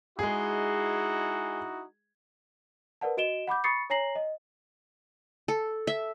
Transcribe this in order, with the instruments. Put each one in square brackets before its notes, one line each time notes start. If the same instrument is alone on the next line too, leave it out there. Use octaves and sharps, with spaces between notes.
[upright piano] G#3 G#4 [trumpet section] D#4 E4 F#4
[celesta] A#4 B4 D5 F#5 A5
F#4 D#5 D7 E7 G7
F#5 B5 D6 G6
B5 C#6 D#6 A6 C7 C#7
C#5 G#5 A#5 A#6 C7 F#7
D#5
[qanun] A4
E5